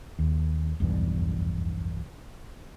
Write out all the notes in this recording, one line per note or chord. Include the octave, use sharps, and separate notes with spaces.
D#2
F1 B1 E2 G2